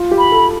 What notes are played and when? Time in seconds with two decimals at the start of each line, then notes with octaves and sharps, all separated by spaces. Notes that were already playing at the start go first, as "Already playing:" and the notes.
Already playing: F4
0.11 G4
0.18 B5
0.32 A4